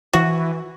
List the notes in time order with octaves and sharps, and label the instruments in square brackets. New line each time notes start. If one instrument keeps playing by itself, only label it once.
[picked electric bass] E3 [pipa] F#4